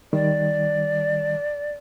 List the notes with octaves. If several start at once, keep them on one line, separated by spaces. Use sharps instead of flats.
D#3 G3 D5